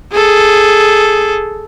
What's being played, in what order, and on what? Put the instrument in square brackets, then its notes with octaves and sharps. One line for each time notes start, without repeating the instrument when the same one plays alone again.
[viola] G#4 A4